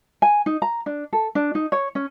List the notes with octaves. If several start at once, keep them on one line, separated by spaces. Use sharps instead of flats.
G#5
D#4
A#5
D4
A4
D4
D#4
C#5
C#4